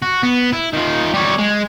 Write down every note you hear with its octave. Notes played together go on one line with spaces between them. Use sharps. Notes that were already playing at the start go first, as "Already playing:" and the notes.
F#4
B3
E4
D#3 F4
G3 C#5
G#3